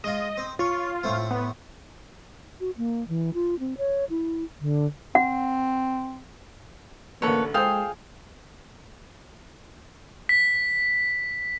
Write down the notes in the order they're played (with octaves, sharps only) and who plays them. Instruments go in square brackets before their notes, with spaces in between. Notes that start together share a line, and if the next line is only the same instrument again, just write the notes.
[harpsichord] G#3 F4 [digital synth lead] D#5
[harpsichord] C4
[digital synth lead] F4 [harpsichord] C#5
[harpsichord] A2 A3 C4
[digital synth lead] B3
[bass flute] F#4
A#3
E3
F4
C4
C#5
E4
D3
[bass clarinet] C4 [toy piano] F#5
[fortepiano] A1 D3 [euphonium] A#3 [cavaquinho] A4 B4 C#5
[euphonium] G#3 [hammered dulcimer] G#4 [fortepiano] A4 C5 [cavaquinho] F5 G5
[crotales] B6